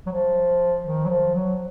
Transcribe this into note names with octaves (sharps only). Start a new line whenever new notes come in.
F#3
F3
D#3
F#3
F3
F#3